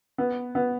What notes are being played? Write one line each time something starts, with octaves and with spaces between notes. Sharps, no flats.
B3
B3